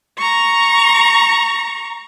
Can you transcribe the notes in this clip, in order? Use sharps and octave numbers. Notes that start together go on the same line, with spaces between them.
A#5 C#6